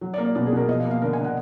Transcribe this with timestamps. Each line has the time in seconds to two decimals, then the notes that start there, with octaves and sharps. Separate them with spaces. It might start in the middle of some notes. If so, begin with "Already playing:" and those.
0.01 F#3
0.14 D5
0.18 A#3
0.25 D5
0.35 B2 D5
0.47 G#4
0.53 B2 A#4
0.69 F3 D#5
0.79 F5
0.85 A#3
0.91 F5
1.02 D3 A#4
1.13 D3 G#5
1.24 F#5